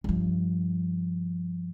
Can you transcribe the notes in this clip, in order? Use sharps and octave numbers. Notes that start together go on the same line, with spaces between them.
G2 F3